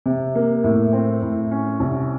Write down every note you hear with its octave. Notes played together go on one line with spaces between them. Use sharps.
C3
A#3
A2
C4
A2
C#4
C2